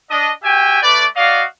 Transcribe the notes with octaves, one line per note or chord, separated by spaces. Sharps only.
D4 D#5
F#4 G4 E5 G5 G#5
A3 B4 D5
F#4 D5 D#5 F5